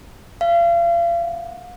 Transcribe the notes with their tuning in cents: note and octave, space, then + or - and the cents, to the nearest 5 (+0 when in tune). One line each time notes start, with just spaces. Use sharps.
F5 -35
F5 +45